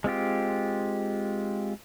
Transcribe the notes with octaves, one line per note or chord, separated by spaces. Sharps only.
G#3 C4 F4 G4